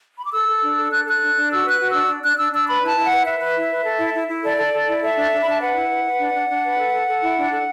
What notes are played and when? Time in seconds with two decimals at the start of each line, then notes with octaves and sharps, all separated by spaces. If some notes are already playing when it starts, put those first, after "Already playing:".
0.18 B5
0.25 D6
0.32 A4 E6
0.47 A4
0.62 D4
0.77 A4
0.91 D4 F#6
1.06 A4 F#6
1.21 D4
1.35 D4
1.50 F#4 E6
1.65 B4 F#6
1.79 F#4
1.89 D4 E6
2.08 D4
2.23 D4 F#6
2.38 D4 E6
2.52 D4 E6
2.67 B4 B5
2.82 E4 A5
2.97 E4 E5
3.06 F#5
3.11 B4
3.26 B4 E5
3.41 B4
3.56 E4
3.71 B4
3.85 A4
3.99 E4
4.13 E4
4.28 E4
4.43 A4 D5
4.57 A4
4.73 A4
4.88 E4
5.02 A4 E5
5.17 D4
5.31 D4
5.40 B5
5.45 D4 A5
5.61 B4 F#5
5.76 E4
5.90 B4
6.04 B4
6.19 D4
6.35 D4
6.49 D4
6.64 B4
6.77 A4
6.93 A4
7.08 A4
7.22 E4
7.36 D4
7.51 A4